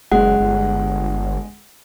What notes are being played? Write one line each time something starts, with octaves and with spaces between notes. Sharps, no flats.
F#1 G#3 F#5
G1